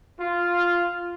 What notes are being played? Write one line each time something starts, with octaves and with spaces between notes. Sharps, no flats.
F4